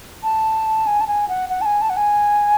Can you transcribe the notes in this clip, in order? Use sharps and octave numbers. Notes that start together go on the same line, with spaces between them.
A5
G#5
A5
G#5
F#5
F#5
A5
G#5
A5
F#5
G#5